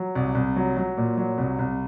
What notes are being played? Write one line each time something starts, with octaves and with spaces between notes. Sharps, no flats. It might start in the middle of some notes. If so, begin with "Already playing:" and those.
Already playing: F#3
C2
C2
F#3
F#3
A#2
F#3
C2
C2